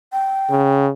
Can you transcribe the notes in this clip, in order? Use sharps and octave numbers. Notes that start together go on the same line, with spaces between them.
G5
C#3